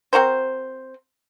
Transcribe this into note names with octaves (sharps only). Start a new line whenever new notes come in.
C4 F#4 A#4 C5